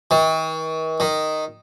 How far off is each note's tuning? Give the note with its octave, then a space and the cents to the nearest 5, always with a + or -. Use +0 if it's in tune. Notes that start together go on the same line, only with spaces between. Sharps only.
D#3 +45
D#3 -5